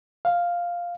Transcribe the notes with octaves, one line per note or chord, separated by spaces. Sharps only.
F5